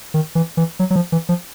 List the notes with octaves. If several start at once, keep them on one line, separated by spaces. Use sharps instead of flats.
D#3
E3
E3
F#3
F#3
F3
E3
F3